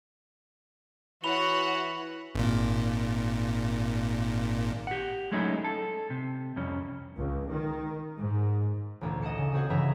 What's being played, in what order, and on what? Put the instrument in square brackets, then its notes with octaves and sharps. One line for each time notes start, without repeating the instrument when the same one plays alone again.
[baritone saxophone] E3 [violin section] F#4 C#5 F#5 [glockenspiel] B5 F7 G7
[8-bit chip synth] G#1 A#2
[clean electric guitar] G4 F#5
F#3 G#3 A3 C#4 D#4 E4
A4
C3
C2 F2 C#4
[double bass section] C#2
D#3
G#2
[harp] A1 D2 A#2
D#5 F#5 A5 C#7
C#3
C4 F#4 G#4 F#5
G2 C#3 E3 E5 F#5 A#5